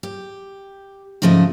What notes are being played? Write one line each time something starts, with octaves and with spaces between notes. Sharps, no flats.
G4
G#2 C#3 F3 A3 D#5